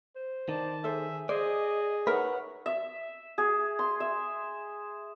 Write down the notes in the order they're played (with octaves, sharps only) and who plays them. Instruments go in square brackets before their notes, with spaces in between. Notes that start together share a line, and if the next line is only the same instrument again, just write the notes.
[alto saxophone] C5
[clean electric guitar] D#3 [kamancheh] D5 A5
[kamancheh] G#4 [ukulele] A4 C5 [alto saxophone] E5
[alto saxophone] G#4 [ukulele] C5 [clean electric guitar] D5 [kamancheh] D#5
[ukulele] D#4 A#4 E5 [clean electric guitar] B4 [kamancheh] C#5 F#5
[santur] E5
G#4
C6
E5